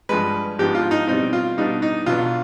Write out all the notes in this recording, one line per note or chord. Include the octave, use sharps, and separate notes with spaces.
G2 F3 G#3 B4
G#2 F3 B3 D4 G4
F4
D#4
B2 G3 C4 D#4
F4
B2 G3 B3 D4 D#4
D#4
B1 B2 B3 D4 F4